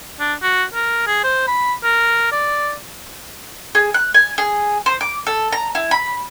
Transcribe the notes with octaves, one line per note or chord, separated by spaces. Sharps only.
D4
F#4
A#4
G#4
C5
B5
A#4
D5
G#4
F#6
G#5
G#4
C5
D6
A4
A#5
E4
B5